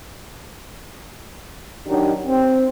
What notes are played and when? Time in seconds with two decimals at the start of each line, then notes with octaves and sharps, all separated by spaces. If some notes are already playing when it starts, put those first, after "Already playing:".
1.87 D#3 F#3 D4 D#4 G4
2.27 C4